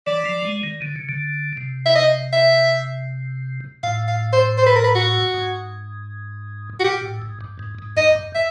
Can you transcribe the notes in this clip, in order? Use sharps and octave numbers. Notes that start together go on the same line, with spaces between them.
E3 D5
F3
G#3
D#3
D3
C#3
D3
C3
E5
D#5
E5
A2 F5
F5
C5
C5
B4
A#4
B4
F#4
G#2
F#4
A#2 G4
A2
G#2
G2
G#2
G#2
G2 D#5
G2
E5